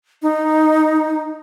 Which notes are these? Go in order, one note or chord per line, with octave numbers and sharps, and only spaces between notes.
D#4